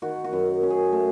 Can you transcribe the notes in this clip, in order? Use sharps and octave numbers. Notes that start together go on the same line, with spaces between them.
D#3 F#4
F#4
F#2
C#4
G#4
A3